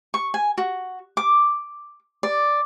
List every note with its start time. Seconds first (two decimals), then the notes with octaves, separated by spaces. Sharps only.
0.14 C#6
0.34 G#5
0.58 F#4
1.17 D6
2.23 D5